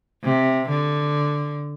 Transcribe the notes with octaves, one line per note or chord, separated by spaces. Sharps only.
C3
D3